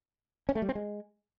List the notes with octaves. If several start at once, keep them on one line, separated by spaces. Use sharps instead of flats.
C#4
A3
G3
C4
G#3